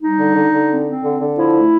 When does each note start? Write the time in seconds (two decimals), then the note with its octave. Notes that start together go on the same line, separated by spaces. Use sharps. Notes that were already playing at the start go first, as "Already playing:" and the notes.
0.02 G3 D#4
0.20 D3
0.36 D3
0.53 D3
0.71 C4
0.87 C4
1.04 D3
1.21 D3
1.38 F3 E4
1.55 A3